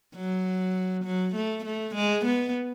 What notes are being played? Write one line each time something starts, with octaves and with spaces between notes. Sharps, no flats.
F#3
F#3
A3
A3
G#3
B3